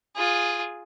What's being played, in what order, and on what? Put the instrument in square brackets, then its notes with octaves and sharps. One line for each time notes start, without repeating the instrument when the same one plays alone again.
[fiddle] F4 G#4